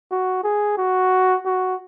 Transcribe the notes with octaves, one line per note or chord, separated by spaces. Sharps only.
F#4
G#4
F#4
F#4